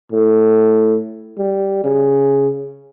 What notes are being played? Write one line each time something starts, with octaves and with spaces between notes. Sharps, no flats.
A2
G3
C#3